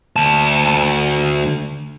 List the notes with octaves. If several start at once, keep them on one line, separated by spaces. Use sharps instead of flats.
D2 A5